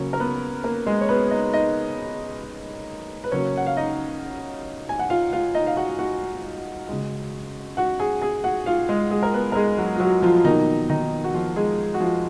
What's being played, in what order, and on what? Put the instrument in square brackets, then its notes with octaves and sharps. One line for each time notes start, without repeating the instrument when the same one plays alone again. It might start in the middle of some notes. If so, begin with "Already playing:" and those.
Already playing: [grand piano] C#3 F#3 A#3 C#4 C#5
A#4
B3 B4
A#3 A#4
G#3 G#4
C#5
B3 B4
D#4 D#5
D#4 D#5
B4
C#3 F#3 A#3 C#4 C#5
F#5
F5
D#4 D#5
G#5
F#5
F4 F5
F4 F5
D#4 D#5
F5
F#4 F#5
F#4 F#5
C#3 G#3
F#4 F#5
G#4 G#5
G#4 G#5
F#4 F#5
F4 F5
G#3 G#4
G#3 G#4
A#4
B3 B4
A#4
G#3 G#4
F#3 F#4
F4
F#3 F#4
F3 F4
F4
B2 D#3 F#3 A#3 D#4
D#3 D#4
F#4
F3 F4
G#3 G#4
F#4
F3 F4